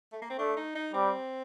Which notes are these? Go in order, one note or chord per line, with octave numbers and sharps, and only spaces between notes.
A3
A#3
C4
A3 D4
D#4
D#4
G3 C4